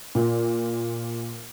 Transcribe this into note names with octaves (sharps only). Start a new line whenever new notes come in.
A#2